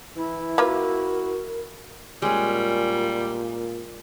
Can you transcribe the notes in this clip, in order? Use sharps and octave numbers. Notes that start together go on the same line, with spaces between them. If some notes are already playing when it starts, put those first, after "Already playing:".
E3 E4
A#3 F4 F#4 A#4 B4
A#2 G3 G#3 C#4